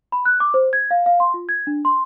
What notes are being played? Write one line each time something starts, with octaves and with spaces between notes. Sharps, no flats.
B5
F#6
D6
C5
G#6
F5
F5
C6
F4
G#6
D4
C6